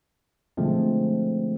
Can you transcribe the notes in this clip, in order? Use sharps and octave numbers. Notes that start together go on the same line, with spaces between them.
B2 D3 F3 G#3 A3 C4